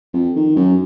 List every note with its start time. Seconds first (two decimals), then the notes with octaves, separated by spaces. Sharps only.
0.14 F2
0.36 D#3
0.56 F#2